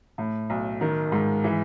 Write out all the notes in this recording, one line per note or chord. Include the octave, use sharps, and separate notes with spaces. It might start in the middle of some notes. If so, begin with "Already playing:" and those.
A2
B1
D#3
G#2
E3